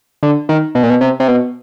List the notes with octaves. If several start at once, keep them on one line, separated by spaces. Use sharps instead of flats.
D3
D#3
B2
A#2
B2
C3
C3
B2